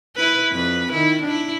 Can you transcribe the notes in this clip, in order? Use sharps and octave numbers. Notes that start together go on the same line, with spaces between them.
E4 B4
F2 B4
D#3 E4
D4 E4